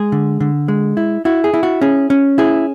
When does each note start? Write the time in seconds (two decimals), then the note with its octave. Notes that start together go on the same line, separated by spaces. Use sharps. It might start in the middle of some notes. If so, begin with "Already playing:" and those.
Already playing: G#3 G#4
0.12 D3
0.41 D3
0.68 G#3
0.97 E4
1.25 E4 F#4
1.44 G#4
1.54 E4
1.63 F#4
1.81 C#4 G#4
2.10 C#4
2.38 E4 G#4